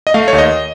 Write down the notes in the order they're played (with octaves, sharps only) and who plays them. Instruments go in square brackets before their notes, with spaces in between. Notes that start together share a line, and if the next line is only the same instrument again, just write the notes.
[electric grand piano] D#5
A3 F5
D#2 C#5
D#5